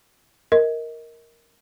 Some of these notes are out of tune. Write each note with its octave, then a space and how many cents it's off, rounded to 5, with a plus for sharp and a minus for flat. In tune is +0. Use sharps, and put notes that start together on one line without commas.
A#4 +0 D#5 +30